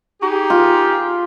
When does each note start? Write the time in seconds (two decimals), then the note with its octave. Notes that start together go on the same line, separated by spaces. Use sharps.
0.21 D#4 G4 G#4
0.50 F4